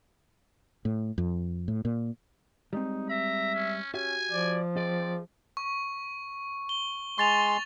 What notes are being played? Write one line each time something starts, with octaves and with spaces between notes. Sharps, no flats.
A2
F2
A2
A#2
G3 G#3 C4 D#4
E5 A#5
C#4
C#4 F#4 G4 E5 G#5
F3 D5
C4 G#4 D5 D#5
C#6
G7
G#3 C6 C#6 A6 F7